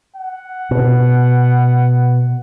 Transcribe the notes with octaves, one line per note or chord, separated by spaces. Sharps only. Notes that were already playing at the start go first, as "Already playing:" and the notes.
F#5
B2